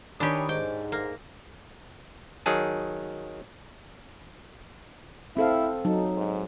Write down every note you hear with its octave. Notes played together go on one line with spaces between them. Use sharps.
D#3 C#4 D4 G4 C#5 G5 B5 D#6
G#2 G5 D6
A#3
D#3 F#3 G#4 A5
C4 E4 A4 F5
F#3 D#4 A4
G#2